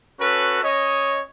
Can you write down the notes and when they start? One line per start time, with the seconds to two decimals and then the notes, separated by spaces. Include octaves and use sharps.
0.19 C#4 F#4 A4 B4
0.62 C#4 C#5 D#5